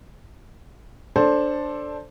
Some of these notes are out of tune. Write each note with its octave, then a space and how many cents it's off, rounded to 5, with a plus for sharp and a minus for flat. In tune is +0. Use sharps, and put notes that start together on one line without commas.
D4 +0 A4 +0 C5 +10